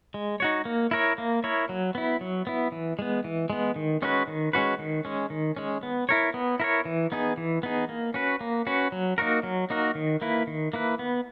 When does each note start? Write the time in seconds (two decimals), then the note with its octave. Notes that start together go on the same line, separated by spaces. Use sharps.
0.14 G#3
0.40 D#4 F#4 C#5
0.65 A#3
0.91 E4 A#4 C#5
1.18 A#3
1.44 E4 A#4 C#5
1.69 F#3
1.95 B3 E4
2.21 F#3
2.47 B3 E4
2.72 E3
2.99 G#3 B3
3.24 E3
3.50 G#3 B3
3.76 D#3
4.02 G#3 C#4 F#4 B4
4.28 D#3
4.53 G#3 C#4 F#4 B4
4.79 D#3
5.05 G#3 C#4
5.30 D#3
5.57 G#3 C#4
5.83 B3
6.09 E4 A#4 C#5
6.34 B3
6.60 E4 A#4 C#5
6.85 E3
7.12 B3 D#4 G#4
7.38 E3
7.63 B3 D#4 G#4
7.89 A#3
8.14 C#4 F#4 B4
8.41 A#3
8.67 C#4 F#4 B4
8.92 F#3
9.18 A#3 D#4 F#4 A#4
9.43 F#3
9.70 A#3 D#4 F#4 A#4
9.95 D#3
10.22 A#3 E4 B4
10.47 D#3
10.73 A#3 E4 B4
10.99 B3